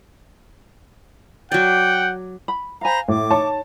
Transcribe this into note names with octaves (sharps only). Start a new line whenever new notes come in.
F#3 D5 F#5 G5
B5
C5 F5 G#5 A#5 B5
A2 D6
D#4 C#5 A5